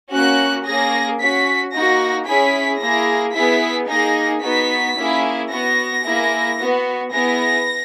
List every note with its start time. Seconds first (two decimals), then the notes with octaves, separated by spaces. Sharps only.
0.12 A#3 C#4 F#4 F#6
0.66 A#3 C#4 G#4 A#6
1.20 C#4 F#4 B6
1.74 A#3 D#4 F#4 A#6
2.27 C#4 E4 G#4 B6
2.81 A#3 E4 G#4 A#6
3.35 B3 E4 G#4 B6
3.89 A#3 D#4 G#4 A#6
4.43 B3 D#4 F#4 B6
4.96 A#3 C#4 E4 G#4
5.51 B3 F#4 A#6
6.04 A#3 E4 G#4
6.58 B3 F#4
7.12 B3 E4 G#4 A#6